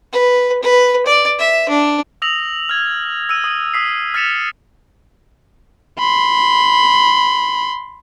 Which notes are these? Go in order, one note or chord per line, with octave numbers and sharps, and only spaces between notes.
B4
B4
D5
E5
D4
D#6 E6 A#6 F7 F#7
F6 G#6
E6 D#7
D#6 D#7
D#6 E6 B6 C7
F6 A6 B6 C#7 E7 F7
B5 C6